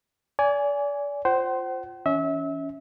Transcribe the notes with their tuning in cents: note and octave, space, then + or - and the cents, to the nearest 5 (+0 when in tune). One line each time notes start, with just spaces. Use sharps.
D5 -35 G#5 +0
F4 +0 C5 +0 F#5 +45
E3 -5 C#4 +15 E5 -30